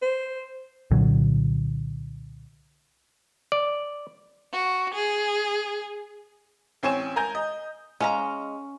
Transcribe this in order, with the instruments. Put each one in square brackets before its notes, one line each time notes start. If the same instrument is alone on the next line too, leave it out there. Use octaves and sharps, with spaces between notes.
[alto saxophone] C5
[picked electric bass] C2 A#2 D3 F#3
[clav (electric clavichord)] D5
[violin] F#4
G#4
[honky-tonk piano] A1 C4 C#5 G#5 C#6 E7
A#4 G#5 A#5 G6
D#5
[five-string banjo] G#3 F5 A#5 [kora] C#4